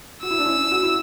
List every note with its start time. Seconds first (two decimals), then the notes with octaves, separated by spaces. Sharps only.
0.23 F#4 E6
0.31 E4
0.39 D4
0.46 C#4 E4
0.71 F#4
0.83 E4